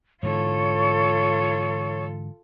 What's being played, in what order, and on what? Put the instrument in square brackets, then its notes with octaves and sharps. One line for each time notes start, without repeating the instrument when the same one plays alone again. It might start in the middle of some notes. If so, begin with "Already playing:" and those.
[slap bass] G#2 D3 E3 [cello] F4 A4 [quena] C#5